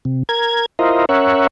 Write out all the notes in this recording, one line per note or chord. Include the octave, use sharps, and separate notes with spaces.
C3
A#4 G#6
E4 F4 A#4 C5 D#5
C#4 A#4 C#5 E5 F#5